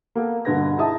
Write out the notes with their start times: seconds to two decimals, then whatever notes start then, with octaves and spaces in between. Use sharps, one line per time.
0.15 A#3 B3 A4
0.45 G2 B2 D3 B4 G#6 A#6
0.77 D#4 E4 G#4 E5 A5 D#6